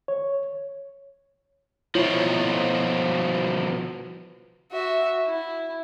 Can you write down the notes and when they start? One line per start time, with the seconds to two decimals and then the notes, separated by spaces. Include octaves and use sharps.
0.08 C#5
1.95 B2 F3 E4 F4 C#5
4.72 F#4 E5
5.26 E4